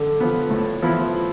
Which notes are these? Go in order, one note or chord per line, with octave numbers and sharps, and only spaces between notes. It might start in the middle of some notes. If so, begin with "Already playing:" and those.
Already playing: D3
F3 B3
A2
F3 B3 E4